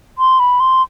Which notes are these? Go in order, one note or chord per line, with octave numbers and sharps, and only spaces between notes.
C6
B5
C6